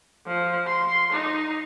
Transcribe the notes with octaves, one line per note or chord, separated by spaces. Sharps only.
F3
C6
D#4